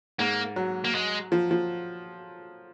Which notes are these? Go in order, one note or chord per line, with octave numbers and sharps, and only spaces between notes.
G#2 A#3
F#3
A#3
G#3
F3
F3